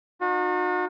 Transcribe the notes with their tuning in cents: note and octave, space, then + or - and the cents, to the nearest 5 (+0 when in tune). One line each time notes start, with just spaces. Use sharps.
D#4 -30 F#4 -40